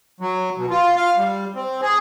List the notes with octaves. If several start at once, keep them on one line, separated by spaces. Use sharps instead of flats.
F#3
B2
F4
F5
G3
C4
G#4